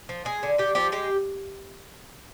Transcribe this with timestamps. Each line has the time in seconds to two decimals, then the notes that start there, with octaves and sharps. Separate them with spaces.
0.09 F3
0.25 G#3 G#4
0.43 D3
0.58 D3 G4
0.75 F3 G4
0.92 G#3 G4